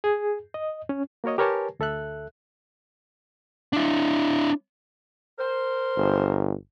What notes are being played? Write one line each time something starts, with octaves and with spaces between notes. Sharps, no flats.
G#4
D#5
C#4
A#3 F#4 A#4 C#5 D#5
G4 A#4 B4 C#5 G#5 A5
D2 A4 E5 F#6
D4 E4
A#4 C5
G1